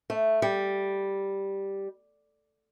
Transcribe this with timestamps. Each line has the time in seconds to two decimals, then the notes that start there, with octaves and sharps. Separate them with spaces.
0.10 A3
0.42 G3